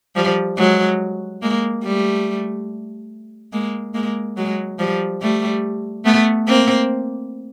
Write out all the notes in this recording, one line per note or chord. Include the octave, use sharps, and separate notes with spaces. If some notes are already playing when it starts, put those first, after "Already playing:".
F3 G3
F#3 G#3
G#3 A#3
G3 A3
G#3 A#3
G#3 A#3
F#3 G#3
F3 G3
G3 A3
A3 B3
A#3 C4